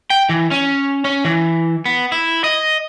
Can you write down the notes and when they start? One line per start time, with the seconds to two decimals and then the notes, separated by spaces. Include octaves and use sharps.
0.10 G5
0.29 E3
0.51 C#4
1.05 C#4
1.25 E3
1.86 B3
2.12 E4
2.44 D#5